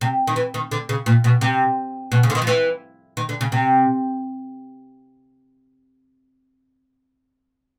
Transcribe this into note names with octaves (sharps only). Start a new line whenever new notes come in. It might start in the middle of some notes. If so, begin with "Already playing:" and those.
C3
D#3
E3
D#3
D3
C#3
A#2
B2
C3
B2
C#3
D3
D#3
F3
E3
D#3
D3
C#3
C3